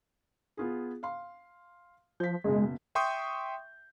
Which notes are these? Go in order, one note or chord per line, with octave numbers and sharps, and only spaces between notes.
B3 F4 G#4
F5 C6
F3 G6 B6
F#1 B2 G#3
E5 G5 C6 C#6 D#6 G6